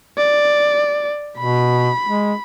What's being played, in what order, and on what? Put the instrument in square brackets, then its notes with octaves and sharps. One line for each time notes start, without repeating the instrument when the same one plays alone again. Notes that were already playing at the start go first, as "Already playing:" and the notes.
[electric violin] D5
[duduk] B2 [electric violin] B5
[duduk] G#3